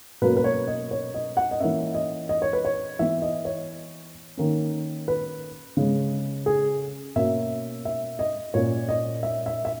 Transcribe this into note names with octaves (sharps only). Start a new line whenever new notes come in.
B2 F#3 A#3 C#4 B4
B4
C#5
D#5
C#5
D#5
F#5
D#5
E3 A#3 C#4 E5
D#5
D#5
C#5
B4
C#5
E3 B3 E5
D#5
C#5
D#3 A#3 C#4
B4
C#3 G#3 C#4
G#4
B2 A#3 C#4 E5
E5
D#5
A#2 A#3 C#4 C#5
D#5
E5
E5
E5